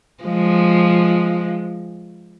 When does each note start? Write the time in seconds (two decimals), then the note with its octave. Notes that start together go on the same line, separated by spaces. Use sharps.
0.24 F3 G#3